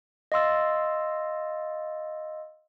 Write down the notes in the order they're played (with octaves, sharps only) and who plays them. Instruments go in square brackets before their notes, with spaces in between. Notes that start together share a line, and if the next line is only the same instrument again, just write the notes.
[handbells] D#5 F5 C6 E6 A6